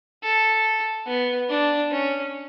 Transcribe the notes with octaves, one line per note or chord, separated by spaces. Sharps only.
A4
B3
D4
C#4